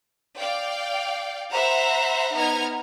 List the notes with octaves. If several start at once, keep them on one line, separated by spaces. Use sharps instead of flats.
D5 F5 G5
C5 E5 F#5 A#5 B5
B3 D#4 A#5 F6 G#6